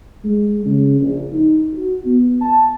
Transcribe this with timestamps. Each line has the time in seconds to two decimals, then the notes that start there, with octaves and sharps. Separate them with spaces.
0.24 G#3
0.65 C#3
1.00 A#1
1.32 D#4
1.73 F#4
2.05 B3
2.42 A5